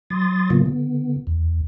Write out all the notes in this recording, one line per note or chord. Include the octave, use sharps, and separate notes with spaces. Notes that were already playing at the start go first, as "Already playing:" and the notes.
F#3 C6 D#6 A6
A2 C#3 F#3 A#3 B3 F4
D3 B3
E2